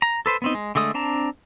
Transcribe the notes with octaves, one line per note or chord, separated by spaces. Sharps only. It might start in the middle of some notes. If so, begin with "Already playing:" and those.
A#5
A4 B4 C5
B3 C4 D#4
G#3
D3 G#3 A3 D#6
C4 D4 A5 A#5